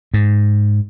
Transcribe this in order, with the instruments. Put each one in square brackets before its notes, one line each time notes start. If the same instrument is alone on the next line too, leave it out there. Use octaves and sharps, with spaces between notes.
[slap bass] G#2